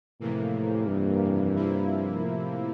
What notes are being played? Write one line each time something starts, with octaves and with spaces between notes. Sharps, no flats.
F2 A2 C3 E3 A#3
G2
C3 F3 A#3 E4
A2